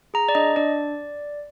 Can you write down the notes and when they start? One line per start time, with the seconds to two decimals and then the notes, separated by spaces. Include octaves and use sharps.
0.14 G#4 A#5
0.29 D5
0.35 D4 D#5
0.56 D4 D5